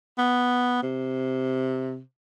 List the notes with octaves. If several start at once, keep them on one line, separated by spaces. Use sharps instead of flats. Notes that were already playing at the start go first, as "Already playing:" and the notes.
B3
C3